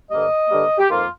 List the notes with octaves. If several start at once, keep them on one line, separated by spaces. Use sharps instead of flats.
G2 D3 G3 A#3 D#5
G2 D3 G3 A#3
G4
F2 D#3 A#3 F4